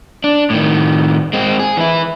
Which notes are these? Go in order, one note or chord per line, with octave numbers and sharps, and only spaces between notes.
D4
A2 D#3
G#3 C4
G#4
E3 E4